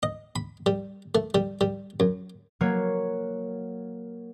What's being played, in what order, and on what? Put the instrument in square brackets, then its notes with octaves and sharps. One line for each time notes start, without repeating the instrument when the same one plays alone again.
[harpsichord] D#5
B5
G3
A3
G3
G3
F#2
[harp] F#3 A#3 C#5